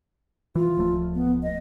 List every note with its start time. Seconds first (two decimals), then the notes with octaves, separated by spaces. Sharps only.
0.55 E3 F4
0.78 D1 F3 A3
1.14 B3
1.43 D#5